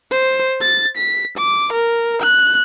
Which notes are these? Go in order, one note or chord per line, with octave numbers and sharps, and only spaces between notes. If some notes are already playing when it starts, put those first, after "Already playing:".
C5
A6
B6
D6
A#4
F#6